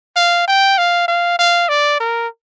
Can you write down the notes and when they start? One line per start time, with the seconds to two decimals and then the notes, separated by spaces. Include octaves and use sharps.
0.16 F5
0.47 G5
0.78 F5
1.08 F5
1.39 F5
1.69 D5
2.00 A#4